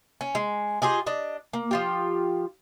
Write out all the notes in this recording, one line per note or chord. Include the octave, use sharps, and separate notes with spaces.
C#4
G#3
F4 G4 G#4 D#5
D4 D#5
A#3
F3 F4 G4